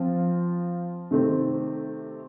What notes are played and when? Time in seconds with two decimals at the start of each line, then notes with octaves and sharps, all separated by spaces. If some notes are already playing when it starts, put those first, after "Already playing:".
Already playing: F3 C4 F4
1.11 C3 D#3 A3 C4